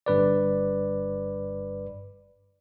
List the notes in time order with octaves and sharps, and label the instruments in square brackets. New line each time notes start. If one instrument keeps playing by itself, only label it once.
[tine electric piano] G1 G2 B4 D5